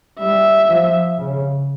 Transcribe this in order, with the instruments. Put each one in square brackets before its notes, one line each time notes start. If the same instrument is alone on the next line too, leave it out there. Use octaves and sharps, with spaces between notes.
[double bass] G3 [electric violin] E5
[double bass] F3
C#3